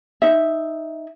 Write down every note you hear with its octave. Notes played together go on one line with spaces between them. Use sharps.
D#4 E5